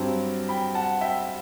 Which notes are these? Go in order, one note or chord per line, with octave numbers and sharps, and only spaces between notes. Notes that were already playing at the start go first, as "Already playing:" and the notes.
Already playing: G2 F#3 C4 A5
G5 B5
F#5 A5
E5 G5